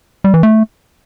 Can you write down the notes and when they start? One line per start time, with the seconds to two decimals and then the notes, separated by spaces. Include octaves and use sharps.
0.24 G3
0.34 E3
0.43 A3